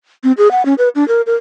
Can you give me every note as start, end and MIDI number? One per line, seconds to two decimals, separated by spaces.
0.24 0.32 60
0.38 0.51 68
0.51 0.65 78
0.65 0.74 61
0.78 0.89 71
0.95 1.06 62
1.08 1.22 70
1.26 1.35 70